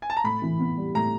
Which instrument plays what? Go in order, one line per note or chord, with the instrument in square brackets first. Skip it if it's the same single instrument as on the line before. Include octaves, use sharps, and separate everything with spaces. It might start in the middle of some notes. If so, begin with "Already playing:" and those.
[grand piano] G#5
A5
A#5
[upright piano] A2 [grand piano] B5
[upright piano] E3
B3
G3
[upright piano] A2 [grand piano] A#5